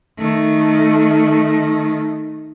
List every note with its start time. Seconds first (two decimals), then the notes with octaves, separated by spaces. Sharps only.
0.19 D#3 A3